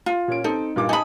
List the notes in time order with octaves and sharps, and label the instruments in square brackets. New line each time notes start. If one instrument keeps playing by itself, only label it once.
[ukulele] F4
[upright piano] A#2 C#4 D7
[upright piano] C4 A4 [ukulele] D#4
[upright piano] G2 A#2 D6
[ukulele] D#4 B5 [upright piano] G#5 A5 D#6